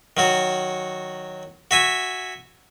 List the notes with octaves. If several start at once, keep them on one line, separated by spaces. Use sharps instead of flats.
D#3 F#3 F#4
F#4 E5 G#5